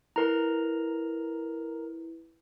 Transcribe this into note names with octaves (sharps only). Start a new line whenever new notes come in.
E4 A#4 B4 A#5